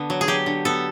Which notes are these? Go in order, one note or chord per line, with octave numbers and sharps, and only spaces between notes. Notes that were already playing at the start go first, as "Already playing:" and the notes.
Already playing: D3 B3
F#3
G#4
F#3 G4
D3
B3 A4